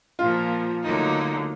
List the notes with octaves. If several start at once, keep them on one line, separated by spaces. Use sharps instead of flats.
A#2 F3 A#3 F4
D2 D3 F#3 A#3 D#4